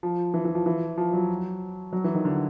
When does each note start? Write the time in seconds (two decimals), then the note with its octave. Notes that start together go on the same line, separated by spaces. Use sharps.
0.03 F3
0.34 E3
0.45 E3
0.55 F3
0.66 E3
0.98 F3
1.13 F#3
1.93 F#3
2.04 E3
2.14 D#3
2.25 D3